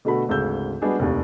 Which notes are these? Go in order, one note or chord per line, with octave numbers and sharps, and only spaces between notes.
B2 D3 A3 F#4 B5
G#1 D2 C#3 E6 G6
G3 G#3 B3 D4 F#4 G#4
F1 A#1 D#2